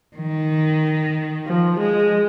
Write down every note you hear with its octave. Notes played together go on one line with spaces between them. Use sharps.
D#3
F3
G#3